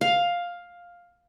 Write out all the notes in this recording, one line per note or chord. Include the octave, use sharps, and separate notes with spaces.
F5